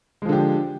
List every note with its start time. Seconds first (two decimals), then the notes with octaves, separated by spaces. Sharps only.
0.22 G#3
0.25 F3
0.29 D3
0.32 G4